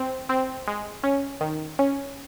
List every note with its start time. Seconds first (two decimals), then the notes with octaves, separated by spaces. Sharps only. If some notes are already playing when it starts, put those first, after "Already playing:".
Already playing: C4
0.29 C4
0.67 G#3
1.03 C#4
1.41 D#3
1.79 C#4